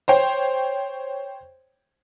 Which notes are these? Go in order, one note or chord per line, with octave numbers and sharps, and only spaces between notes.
C5 C#5 G5